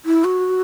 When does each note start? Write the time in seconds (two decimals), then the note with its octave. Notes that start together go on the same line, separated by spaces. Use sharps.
0.05 E4
0.24 F#4